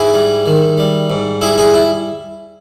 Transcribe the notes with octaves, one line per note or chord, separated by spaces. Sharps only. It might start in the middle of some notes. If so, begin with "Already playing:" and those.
Already playing: G#2 E4 G#4
G3
D#3
G3
G#2
G3 E4 G#4
E4 G#4
E4